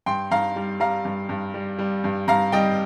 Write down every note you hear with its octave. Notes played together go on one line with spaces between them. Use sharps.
G2 G5 C6
G2 F5 A#5
G3
G3 F5 A#5
G2
G2
G3
G3
G2
G2 F5 A#5
G3 D#5 G5